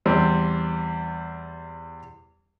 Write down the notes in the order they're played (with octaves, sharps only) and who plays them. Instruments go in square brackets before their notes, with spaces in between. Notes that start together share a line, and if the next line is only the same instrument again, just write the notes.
[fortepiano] E2 G3 C4